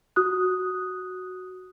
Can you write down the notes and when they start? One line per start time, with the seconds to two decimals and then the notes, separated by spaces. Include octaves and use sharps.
0.16 F#4 D#6 F#6